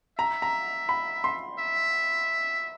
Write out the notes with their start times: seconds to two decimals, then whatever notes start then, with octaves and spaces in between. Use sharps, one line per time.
0.18 E5 A#5
0.42 A#5
0.89 B5
1.24 C6
1.59 E5